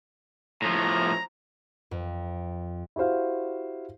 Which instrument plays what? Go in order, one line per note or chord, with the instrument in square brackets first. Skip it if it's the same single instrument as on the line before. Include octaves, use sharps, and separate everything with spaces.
[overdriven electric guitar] A2 F3 [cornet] A#5
[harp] F2
[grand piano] E4 F#4 G4 C5 F5